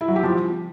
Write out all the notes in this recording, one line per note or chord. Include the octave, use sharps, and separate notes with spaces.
E4
F#3
G4
F3